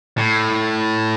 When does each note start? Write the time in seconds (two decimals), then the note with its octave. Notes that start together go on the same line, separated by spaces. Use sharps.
0.18 A2